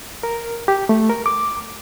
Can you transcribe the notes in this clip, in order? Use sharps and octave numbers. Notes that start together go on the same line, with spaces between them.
A#4
G4
A3
A#4
D6